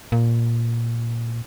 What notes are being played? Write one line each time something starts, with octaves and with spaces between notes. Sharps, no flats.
A#2